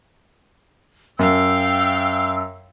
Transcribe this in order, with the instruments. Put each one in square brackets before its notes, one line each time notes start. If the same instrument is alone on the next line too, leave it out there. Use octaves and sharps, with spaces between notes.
[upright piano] F#2 [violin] F5 G5 [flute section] E6